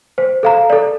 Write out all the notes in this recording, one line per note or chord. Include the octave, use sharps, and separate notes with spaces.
C5
A4 F5 A#5
A4 D5